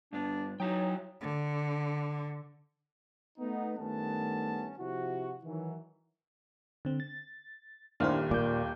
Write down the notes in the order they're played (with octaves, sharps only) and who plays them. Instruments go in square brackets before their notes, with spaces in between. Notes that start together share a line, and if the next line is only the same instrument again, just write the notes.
[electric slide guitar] G2 B3 [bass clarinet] D4
[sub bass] F#3 [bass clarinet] D#4 [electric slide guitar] E4 F#4 G5 [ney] C#5
[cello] D3
[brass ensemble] A3 B3 D#4
G2 D#3 A3 B3 C#4 A5
C3 F3 E4 F#4
D#3 E3 F#3
[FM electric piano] D3 C4
A6
[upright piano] D#1 D#2 F6 [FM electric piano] D4 E4 C5
[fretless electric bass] A#2 [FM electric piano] D6 G6